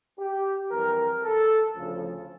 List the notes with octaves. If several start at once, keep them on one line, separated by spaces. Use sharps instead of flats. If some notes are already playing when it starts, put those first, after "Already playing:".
G4
F2 E3 G3 A#4
A4
D2 C#3 F3